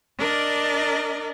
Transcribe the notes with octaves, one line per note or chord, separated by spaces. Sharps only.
D4 A#4 D5 D#5